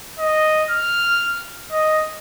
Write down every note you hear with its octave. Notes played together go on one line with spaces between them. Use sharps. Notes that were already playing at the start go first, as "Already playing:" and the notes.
D#5
F6
D#5